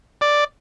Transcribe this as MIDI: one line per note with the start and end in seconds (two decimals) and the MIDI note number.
0.21 0.44 74